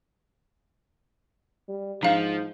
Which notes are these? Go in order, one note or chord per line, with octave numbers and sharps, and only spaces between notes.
G3
G#2 F3 D4 F5